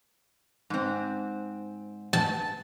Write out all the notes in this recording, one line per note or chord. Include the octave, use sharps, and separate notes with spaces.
G#2 C4
A5